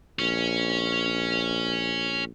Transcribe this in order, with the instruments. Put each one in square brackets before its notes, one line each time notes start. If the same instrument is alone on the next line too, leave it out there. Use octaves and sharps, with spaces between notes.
[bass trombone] A#1 [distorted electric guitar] C#4